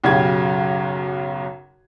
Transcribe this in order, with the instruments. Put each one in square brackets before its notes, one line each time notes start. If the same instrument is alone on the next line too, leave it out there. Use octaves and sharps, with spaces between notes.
[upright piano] B1 F#2 C#3 G4 G#6